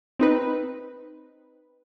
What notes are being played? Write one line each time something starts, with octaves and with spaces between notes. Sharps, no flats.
C4 D#4 B4